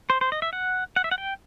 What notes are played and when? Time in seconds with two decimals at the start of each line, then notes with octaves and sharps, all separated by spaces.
0.10 C5
0.21 C5
0.32 D#5
0.42 E5
0.53 F#5
0.96 F#5
1.04 E5
1.11 F#5
1.18 G5